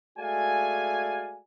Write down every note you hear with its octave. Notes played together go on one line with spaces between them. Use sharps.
G#3 A3 F#4 D5 F5 G#5